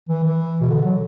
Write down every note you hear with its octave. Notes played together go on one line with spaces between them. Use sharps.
E3
E3
B2
D3
F#3